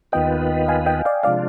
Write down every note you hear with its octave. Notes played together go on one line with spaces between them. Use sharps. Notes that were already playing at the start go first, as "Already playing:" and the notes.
D#2 D#3 B3 F4 B4 D#5 G5
F5 G#5
D#5 G5
D5 F5
C3 F3 G#3 D4 F4 D5 F5